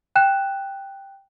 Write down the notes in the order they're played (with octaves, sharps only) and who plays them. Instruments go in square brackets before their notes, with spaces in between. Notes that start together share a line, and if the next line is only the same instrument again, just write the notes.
[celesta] G5 F#6 E7